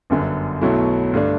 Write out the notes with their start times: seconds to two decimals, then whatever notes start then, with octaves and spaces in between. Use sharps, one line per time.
0.10 G1 F#2 D3
0.61 B1 B2 F#3 A3 E4
1.14 G2 D3 A3 D4